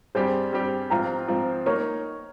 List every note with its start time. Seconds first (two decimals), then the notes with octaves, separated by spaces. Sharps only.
0.15 G2 G3 C4 G4 G#4 C5
0.53 G2 G3 C4 G4
0.90 G#2 F3 C4 F4 G5 A#5
1.28 G#2 F3 C4 F4
1.66 A#3 D#4 A#4 C#5